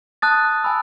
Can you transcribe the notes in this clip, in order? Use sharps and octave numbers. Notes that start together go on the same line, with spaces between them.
A5 D#6 F#6 A6
G#5 B5 E6